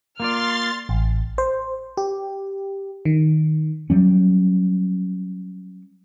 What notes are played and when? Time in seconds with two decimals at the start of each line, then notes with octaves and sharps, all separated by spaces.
0.20 A#3 F4 D5 C6 F6 A6
0.89 A1
1.38 C5
1.97 G4
3.05 D#3
3.90 F#3 G3 C#4